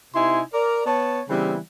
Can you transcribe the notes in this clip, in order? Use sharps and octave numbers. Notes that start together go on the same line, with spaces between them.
C3 D#4 E4 G#5 C6
A#4 D5
B3 C#5 A5
C#3 E3 G3 B3 C4